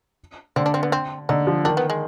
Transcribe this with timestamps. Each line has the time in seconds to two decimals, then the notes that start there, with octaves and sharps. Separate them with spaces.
0.56 D3 C4
0.66 D4
0.74 C4
0.83 B3
0.92 C4
1.29 D3 D#4
1.47 F3
1.65 D#3 D4
1.77 B3
1.90 G#3